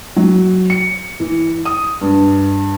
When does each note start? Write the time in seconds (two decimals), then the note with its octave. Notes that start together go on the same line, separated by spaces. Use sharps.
0.16 F#3
0.70 C#7
1.20 E3
1.65 D#6
2.01 G2